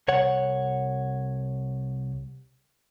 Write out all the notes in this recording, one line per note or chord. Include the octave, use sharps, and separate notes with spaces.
C2 C#5 F#5